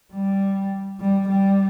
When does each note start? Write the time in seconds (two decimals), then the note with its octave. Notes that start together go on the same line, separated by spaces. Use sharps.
0.13 G3
1.01 G3
1.29 G3